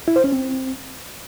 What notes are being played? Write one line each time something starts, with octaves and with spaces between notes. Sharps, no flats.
E4
C5
C#4
C4